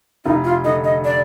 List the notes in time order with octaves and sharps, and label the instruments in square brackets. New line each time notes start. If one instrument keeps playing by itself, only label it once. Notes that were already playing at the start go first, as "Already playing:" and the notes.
[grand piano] F1 [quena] D#4
[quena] F4
[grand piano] D3 [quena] D#5
[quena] D#5
D5